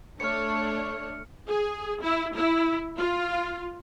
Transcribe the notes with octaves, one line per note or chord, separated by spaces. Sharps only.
A3 D4 C#5 F6 C#7
G#4
E4
E4
F4